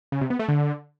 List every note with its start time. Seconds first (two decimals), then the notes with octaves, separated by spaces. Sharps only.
0.12 C#3
0.21 C3
0.30 B3
0.39 A3
0.48 D3